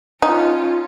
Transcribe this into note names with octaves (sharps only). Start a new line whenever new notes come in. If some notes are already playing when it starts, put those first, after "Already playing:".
C#4 D#4 F4